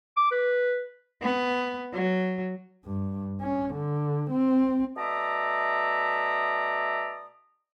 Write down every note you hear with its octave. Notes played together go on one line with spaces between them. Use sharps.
D6
B4
B3
F#3
G2
C#4
D3
C4
B2 A3 D5 E5 A#5 D#6